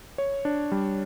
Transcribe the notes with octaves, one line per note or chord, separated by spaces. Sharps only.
C#5
D4
G3